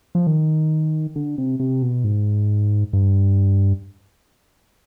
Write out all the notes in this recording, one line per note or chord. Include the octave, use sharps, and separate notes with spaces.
F3
D#3
D3
C3
C3
B2
G#2
G2